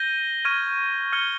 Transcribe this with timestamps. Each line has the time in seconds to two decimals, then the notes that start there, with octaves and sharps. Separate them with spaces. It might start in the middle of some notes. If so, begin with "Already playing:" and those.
Already playing: G6 A#6 D#7 G7
0.45 C#6 F6 G#6 D#7 G7
1.13 F6 G#6 C#7 G7